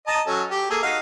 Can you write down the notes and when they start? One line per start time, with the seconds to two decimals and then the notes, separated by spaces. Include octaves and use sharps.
0.07 D#5 A5 A#5
0.27 F#3 C#4 A4
0.51 G4
0.70 A#3 G#4 A4
0.83 D#4 F#4 F5